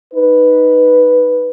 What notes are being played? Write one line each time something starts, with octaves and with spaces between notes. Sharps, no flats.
D#4 B4